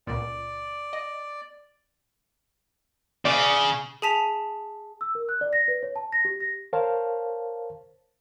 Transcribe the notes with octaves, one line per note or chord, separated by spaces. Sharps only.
C#2 A#2 D5
D#5
C#3 D5
G#4 G#5 A5 B6 F7
E6
A#4
F#6
D5
A#6
B4
C#5
A5
A#6
G4
A#6
A#4 C5 C#5 F5 A5